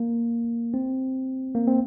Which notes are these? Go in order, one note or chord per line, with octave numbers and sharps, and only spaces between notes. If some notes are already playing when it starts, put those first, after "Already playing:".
Already playing: A#3
C4
A#3
C4